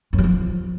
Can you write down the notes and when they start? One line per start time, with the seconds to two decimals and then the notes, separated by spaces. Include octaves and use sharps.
0.13 F#2
0.18 F#3
0.24 F3